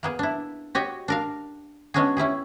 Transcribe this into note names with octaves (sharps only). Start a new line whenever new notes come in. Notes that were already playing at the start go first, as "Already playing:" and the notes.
A#3 B3 G#4
D4 E4
F#4 G4 C#5 D#5
D4 A#4 F5
G#3 B3 C#4 D4 F#4 G#4
C#4 E4 G4 G#4